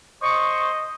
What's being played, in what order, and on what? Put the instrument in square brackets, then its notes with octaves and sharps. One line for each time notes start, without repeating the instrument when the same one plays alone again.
[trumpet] C5 [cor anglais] D#5 [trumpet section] C#6